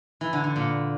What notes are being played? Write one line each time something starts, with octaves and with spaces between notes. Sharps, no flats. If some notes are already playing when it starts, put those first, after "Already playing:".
E3
D3
D3
A#2